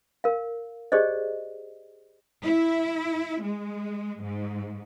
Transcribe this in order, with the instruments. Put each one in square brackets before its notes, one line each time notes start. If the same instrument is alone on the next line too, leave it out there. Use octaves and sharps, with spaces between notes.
[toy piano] A#4 F5
G4 G#4 C5 D5 D#5
[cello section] E4
G#3
G#2